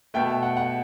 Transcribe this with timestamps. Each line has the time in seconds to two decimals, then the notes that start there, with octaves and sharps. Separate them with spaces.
0.14 B2 A3 G5
0.42 F#5
0.57 F#5